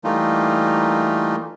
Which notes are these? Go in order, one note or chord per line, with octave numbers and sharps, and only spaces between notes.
E3 G3 A3 A#3 D#4 F4